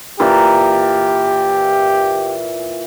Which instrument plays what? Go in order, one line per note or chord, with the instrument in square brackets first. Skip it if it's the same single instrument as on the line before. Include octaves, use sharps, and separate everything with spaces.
[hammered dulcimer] A#2 E3 [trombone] G4